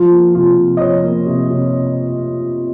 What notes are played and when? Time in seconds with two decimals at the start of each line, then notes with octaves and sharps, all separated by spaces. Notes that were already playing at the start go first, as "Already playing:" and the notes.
Already playing: F3 F4
0.11 A#3
0.34 C3 F4
0.58 C3
0.77 D#5
0.80 F3 C#5
1.04 A#3
1.26 C3
1.50 C3